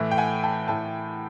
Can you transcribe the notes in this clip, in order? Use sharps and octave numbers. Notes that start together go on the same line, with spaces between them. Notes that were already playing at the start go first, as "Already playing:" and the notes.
Already playing: A2 E3 A3
G5
F#5 G#5
G5 A5
A2 E3 A3 G5 A5